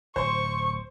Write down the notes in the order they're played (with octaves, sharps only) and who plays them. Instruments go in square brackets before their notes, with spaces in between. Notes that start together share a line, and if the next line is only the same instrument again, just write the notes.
[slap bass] D1 [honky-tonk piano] C5 C6 [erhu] C#6